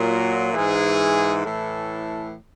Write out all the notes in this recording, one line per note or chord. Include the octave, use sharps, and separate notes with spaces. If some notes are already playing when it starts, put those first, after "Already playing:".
Already playing: A#2 F#3 A#4
G#2 E3 G#4
A2 E3 A4